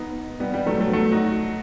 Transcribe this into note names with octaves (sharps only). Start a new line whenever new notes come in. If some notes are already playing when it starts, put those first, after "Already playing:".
Already playing: B3 D#4
G3 B3
G3 B3
F#3 A3
F#3 A3
F#3 A3
D#4 F#4